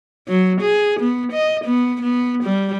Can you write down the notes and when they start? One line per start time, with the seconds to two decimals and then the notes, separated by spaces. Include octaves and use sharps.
0.28 F#3
0.61 G#4
1.00 B3
1.32 D#5
1.65 B3
2.02 B3
2.44 G3